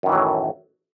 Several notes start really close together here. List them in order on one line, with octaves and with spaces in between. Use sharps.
F#2 D#3 E3 F#3 A2